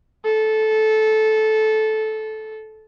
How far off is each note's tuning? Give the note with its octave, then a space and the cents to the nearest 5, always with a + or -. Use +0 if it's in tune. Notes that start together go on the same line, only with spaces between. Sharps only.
A4 -15